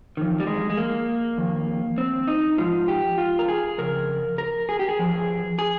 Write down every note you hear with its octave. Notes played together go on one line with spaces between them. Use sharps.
F2 D#3
G3
G#3
G#3
A#3
F2 D#3
C4
D#4
G#2 F3 F4
G4
F4
A#4
G#4
F2 C#3 A#4
A#4
G#4
G4
G#4
G2 F3
G#4